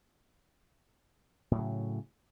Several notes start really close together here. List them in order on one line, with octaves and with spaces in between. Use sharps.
A2 F#3 C#3